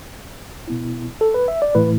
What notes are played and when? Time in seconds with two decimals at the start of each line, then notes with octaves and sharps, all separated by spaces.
0.68 B2 B3 E4
1.21 A4
1.34 B4
1.48 E5
1.62 D5
1.75 A2 E3 A3 E4 B4